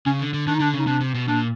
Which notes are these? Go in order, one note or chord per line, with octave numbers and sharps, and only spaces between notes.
C#3 C#4
D3
D3
D#3 D4
D#4
D3 D4
C#3
D#4
C3 D4
C3
B2
A#2 D4